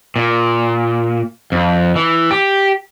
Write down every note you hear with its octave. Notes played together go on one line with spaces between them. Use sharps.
A#2
F2
E3
G4